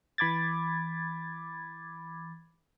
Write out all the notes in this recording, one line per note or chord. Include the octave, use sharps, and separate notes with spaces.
E3 B5 D6 G#6 A6